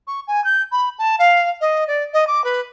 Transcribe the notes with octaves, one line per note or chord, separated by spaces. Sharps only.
C#6
G#5
G6
B5
A5
F5
D#5
D5
D#5
D6
B4